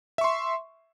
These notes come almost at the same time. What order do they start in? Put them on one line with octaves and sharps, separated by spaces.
E5 C#6 C6